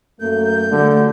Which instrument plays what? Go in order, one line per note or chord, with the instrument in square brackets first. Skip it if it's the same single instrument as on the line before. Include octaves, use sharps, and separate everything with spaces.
[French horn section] F#2 A3 A#3 [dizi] G6
[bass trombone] D3 [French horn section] F#3 G4 [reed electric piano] A3